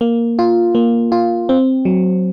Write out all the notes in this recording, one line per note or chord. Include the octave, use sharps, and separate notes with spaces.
A#3
F4
A#3
F4
C4
F#3